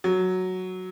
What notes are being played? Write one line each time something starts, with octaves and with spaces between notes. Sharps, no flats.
F#3